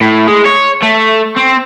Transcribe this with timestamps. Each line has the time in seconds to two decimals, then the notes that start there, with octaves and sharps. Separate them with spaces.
0.01 A2
0.28 G#3
0.46 C#5
0.83 A3
1.37 C4